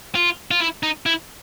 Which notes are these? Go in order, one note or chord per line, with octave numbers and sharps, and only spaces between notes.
F4
F4
E4
D#4
E4